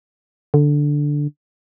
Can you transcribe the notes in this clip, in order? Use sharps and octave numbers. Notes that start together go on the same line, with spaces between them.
D3